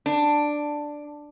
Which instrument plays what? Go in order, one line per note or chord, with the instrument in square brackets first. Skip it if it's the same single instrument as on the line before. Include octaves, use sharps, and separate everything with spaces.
[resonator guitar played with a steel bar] D4